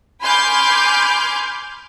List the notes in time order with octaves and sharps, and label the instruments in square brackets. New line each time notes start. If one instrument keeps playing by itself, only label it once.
[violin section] G#5 B5 C6 D6 F6 G6